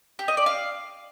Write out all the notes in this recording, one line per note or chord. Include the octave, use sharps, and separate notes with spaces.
G4
D#5
D5
F5